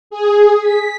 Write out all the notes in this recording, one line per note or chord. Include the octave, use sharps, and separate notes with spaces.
G#4
B6